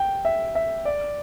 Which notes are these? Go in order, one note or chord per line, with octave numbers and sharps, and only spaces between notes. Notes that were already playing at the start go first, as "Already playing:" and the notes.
Already playing: G5
E5
E5
D5